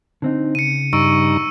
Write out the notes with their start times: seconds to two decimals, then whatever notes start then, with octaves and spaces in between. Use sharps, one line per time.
0.22 D3 C4 D#4
0.55 C#3 C#7 D#7
0.93 G2 D#4 A#5 C#6 E6 D7